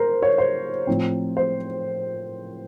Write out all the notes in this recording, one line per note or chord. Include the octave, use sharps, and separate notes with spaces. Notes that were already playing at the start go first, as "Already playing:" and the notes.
Already playing: A#4 C5
C#5
C5
A2 F3 C4
C5